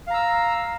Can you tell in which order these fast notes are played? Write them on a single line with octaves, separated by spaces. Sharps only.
F5 A#5 E6